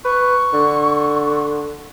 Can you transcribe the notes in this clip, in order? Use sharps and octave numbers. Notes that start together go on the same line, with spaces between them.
B4 C#6
D3